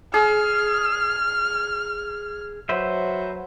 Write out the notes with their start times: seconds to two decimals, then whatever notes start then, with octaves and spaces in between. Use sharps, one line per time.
0.14 G#4 F6
2.69 F#3 B4 C5 E5